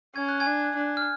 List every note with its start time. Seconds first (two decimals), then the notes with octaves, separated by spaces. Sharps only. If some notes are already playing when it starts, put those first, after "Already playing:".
0.16 C#4 G#6
0.28 F#6
0.40 G#5 G#6
0.47 D4
0.76 D4
0.97 F6